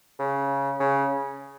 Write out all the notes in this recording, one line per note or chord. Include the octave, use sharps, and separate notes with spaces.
C#3
C#3